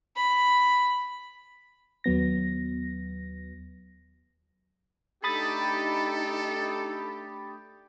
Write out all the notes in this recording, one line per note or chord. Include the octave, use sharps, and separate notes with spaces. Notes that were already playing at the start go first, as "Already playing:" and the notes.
B5
D#2 F#3 B3 A#6
A3 D4 D#4 G4 A4 B5 D#6 A6